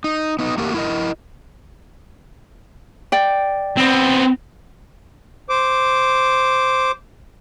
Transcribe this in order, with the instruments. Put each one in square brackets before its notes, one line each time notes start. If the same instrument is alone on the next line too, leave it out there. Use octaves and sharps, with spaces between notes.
[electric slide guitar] D#4
B3 D#4
A3 A#3 F#4 G4 A#4
E4 A#4 D#5
[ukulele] D5 G5
[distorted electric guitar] B3 C4
[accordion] C5 D6